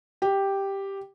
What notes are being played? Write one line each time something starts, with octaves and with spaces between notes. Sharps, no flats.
G4